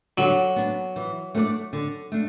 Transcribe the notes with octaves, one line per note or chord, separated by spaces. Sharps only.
D3 F#3
B3 D4
E3
A3 D4 B4 D5
D3
A3 D4